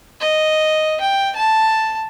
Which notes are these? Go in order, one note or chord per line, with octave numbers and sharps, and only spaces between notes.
D#5
G5
A5